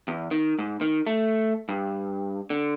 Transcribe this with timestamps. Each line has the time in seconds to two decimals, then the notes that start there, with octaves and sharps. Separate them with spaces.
0.08 E2
0.31 D#3
0.59 G#2
0.81 D#3
1.07 A3
1.69 G2
2.50 D3